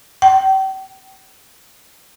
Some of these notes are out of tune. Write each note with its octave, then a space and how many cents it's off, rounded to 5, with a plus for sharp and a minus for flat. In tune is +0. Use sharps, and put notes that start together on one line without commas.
G5 -40